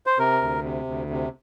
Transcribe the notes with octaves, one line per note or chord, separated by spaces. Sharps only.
C5
C3 A#4
D2
C3
D2
C3